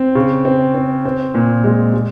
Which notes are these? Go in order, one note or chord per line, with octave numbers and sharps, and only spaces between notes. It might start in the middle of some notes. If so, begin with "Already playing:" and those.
Already playing: C4
C#3
C4
C4
C4
A#2
G#3
G#3